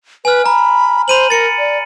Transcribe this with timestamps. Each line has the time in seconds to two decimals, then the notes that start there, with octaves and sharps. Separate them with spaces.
0.25 B4 G#5 F6
0.46 A#5 B5
1.08 C5 B5 D#7 F#7
1.30 A#4 A6 C#7
1.58 D5